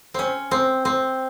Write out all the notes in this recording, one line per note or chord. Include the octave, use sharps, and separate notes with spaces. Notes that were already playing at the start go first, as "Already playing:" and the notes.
C4 C#4
C4
C4